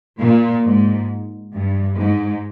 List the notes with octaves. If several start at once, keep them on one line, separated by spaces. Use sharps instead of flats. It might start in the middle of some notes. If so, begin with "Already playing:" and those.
A#2
G#2
G2
G#2